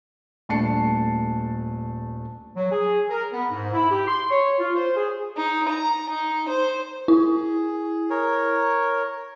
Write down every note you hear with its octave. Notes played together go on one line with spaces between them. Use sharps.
D#1 A3 D4 A5 C7 C#7
F#3
G#4
A#4
B3
G#2
E4
G4
C6
C#5
F4
C5
G#4
D#4
A#5
D#4
C5
E4 G#4
A#4 C#5